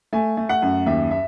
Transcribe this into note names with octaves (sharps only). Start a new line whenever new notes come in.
A3 G#5
A3
F#5
F#2
D#2 E5
E5